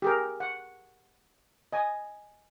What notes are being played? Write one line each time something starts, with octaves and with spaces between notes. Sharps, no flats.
G4 G#4 A#4
F#5
D#5 G#5